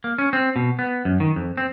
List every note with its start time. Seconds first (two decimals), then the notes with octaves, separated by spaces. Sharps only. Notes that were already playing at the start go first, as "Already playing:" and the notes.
0.04 A#3
0.18 C#4
0.33 C4
0.56 B2
0.79 B3
1.05 F#2
1.20 D#3
1.36 F2
1.57 C4